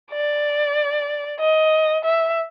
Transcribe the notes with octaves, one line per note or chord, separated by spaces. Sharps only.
D5
D#5
E5